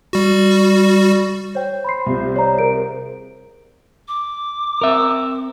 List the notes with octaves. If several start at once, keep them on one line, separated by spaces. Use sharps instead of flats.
G3 F#4
C5 C#5 G5
B5 C6 C7
C2 C3 F4
C#5 D5 A#5
G#4 A#4 D7
D6
C4 A#4 E5